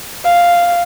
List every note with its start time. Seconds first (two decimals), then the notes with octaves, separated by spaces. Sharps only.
0.24 F5